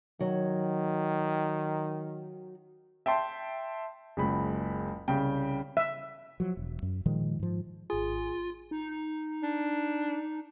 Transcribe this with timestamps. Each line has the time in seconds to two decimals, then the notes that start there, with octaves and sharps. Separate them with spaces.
0.21 D#3 F#3
3.06 E5 G5 A5 C6
4.17 F#1 C#2 B5
5.08 C2 C#3 G5
5.77 E5
6.40 F3 F#3
6.57 E1
6.83 F#2
7.06 A#2 D#3 F3 G#3
7.40 G#2 F3
7.90 G#1 F4 G#4
8.71 D#4
9.43 D4